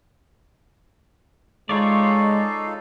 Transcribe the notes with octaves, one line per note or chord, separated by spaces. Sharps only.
G#3 D#4 F4 A4 C#5 D5 F5